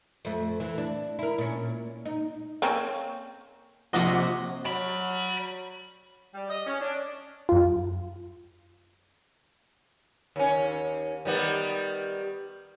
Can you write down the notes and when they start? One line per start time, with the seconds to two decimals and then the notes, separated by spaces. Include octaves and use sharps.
0.25 F2 A3
0.60 E3
0.78 D4
1.19 E4 A#4
1.38 A#2 C#4
2.05 D#4
2.62 A#3 C4 C#4
3.93 A#1 C3 F#4 D#5 F#5
4.65 F#3 D5 B5
6.34 G3
6.50 D#5
6.66 C#4
6.81 D4
7.49 F#2 F4
10.36 D#2 C#4
11.25 D#3 G3 B3